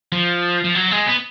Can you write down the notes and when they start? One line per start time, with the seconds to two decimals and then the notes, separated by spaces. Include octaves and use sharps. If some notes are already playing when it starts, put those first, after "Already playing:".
0.12 F3
0.64 F3
0.75 F#3
0.91 G#3
1.06 B3